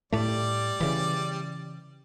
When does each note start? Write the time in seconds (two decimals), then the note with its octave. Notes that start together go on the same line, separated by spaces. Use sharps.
0.12 A2 G3 A3 D5
0.80 C#3 E3